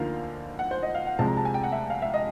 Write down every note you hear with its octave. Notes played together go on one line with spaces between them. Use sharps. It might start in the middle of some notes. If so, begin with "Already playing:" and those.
Already playing: D2 D3 F3 A#3 D#4 F5
F#5
C5
D#5
F5
F#5
C2 C3 F3 G#3 A5
A#5
A5
G#5
G5
F#5
E5
F5
E5
D#5